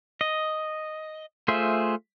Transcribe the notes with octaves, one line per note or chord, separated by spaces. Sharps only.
D#5
A3 F4 G#4 C5 E5